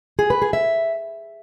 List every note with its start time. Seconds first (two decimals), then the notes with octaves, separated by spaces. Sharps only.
0.19 G#4
0.30 B4
0.42 G#4
0.53 E5